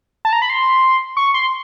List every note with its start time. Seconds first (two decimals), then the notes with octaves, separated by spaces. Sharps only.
0.25 A5
0.33 A#5
0.42 B5
0.50 C6
1.17 C#6
1.34 C6